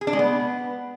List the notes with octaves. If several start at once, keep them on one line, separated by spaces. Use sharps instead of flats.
G#4
D4
G#3
B3